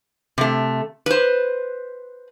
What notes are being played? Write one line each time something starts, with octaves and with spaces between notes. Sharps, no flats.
C3 A3
B4 C5